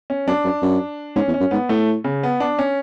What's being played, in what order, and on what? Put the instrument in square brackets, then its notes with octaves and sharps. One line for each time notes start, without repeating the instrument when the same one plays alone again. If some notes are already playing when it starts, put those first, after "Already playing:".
[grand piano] C#4
[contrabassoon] F#2 [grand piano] D4
[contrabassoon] F#2
F#2
[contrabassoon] G#2 [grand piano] C#4
[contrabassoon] E2
[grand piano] C#4
[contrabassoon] F#2
[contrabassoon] G#2 [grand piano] B3
[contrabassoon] A2 [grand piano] A3
[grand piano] C#3
B3
D4
C#4